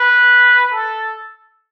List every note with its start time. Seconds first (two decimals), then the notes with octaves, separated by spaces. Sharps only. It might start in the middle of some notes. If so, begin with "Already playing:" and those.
Already playing: B4
0.71 A4